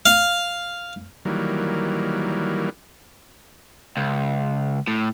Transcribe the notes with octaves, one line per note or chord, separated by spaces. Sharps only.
F5
D#3 E3 F#3 G3 A#3
C#2
A2